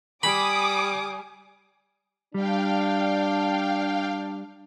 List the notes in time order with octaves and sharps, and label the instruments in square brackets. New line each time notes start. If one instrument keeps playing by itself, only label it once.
[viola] G3 [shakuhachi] G#5 [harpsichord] B5 [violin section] D6 D#6
[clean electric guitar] G3 [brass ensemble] D4 [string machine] F5 G5